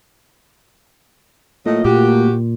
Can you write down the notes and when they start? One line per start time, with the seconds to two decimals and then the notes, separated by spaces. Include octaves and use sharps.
1.66 A2 F#3 A3 A#3 F4 D#5
1.85 A#2 F#4 G4